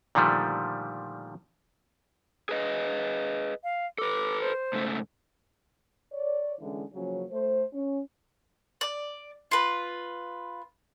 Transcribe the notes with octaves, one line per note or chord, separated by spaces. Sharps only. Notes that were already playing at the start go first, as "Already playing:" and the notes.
A#2 D3 D#3 F3 G3 A3
G#4 B4 D#5
F5
A4 B4 D6
C5
G#2 C#3 A3
C#5 D5
D3 E3 G#3 C#4 E4
C#3 F3 F#3 A#3 C#4
A3 C5
C#4
D5
F4 B4